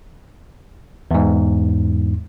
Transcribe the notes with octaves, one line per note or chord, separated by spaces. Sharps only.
E2 G#2